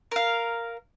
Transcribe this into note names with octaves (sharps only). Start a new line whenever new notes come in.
A#4 F5